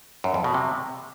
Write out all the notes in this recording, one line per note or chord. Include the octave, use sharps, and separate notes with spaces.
F#2
F2
B2
C3